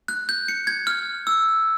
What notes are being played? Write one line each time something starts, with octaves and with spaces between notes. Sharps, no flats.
F#6
G6
C#7
G#6
F6
E6